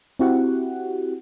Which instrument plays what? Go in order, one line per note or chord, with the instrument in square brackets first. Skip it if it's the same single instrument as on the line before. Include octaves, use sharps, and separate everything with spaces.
[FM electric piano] C4 E4 F#4 G4 F#5